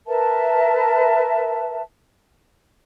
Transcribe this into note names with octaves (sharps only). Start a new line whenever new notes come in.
A#4 B4 E5 A5